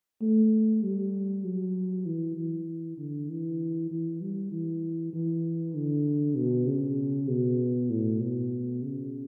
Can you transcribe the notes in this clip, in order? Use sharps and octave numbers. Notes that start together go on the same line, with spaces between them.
A3
G3
F#3
E3
E3
D3
E3
E3
G3
E3
E3
D3
B2
C#3
B2
A2
B2
C#3